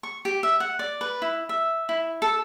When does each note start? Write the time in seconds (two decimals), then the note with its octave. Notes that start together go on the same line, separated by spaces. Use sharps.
0.03 C#6
0.25 G4
0.43 E5
0.60 F#5
0.79 D5
1.01 B4
1.22 E4
1.49 E5
1.89 E4
2.22 A4